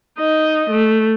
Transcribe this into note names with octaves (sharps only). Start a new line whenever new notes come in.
D#4 D#5
A3